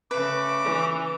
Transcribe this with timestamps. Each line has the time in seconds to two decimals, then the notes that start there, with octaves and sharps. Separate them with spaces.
0.11 C#3 A3 B4 D6
0.64 E3